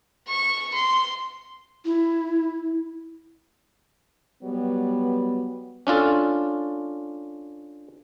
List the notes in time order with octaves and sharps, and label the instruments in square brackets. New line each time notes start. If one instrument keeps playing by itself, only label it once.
[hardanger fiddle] C#6
C6
[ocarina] E4
[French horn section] F#3 G3 B3
[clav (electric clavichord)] C#4 D4 F4 A4